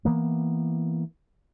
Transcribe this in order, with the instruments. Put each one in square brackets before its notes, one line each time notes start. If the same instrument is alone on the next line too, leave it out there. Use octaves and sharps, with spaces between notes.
[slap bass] E3 A#3 B3